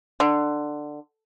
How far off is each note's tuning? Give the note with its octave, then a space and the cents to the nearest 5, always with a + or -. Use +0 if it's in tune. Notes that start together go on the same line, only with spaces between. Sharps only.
D3 +15